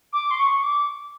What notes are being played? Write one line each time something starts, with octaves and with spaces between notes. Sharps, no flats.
D6
C6
C#6
D6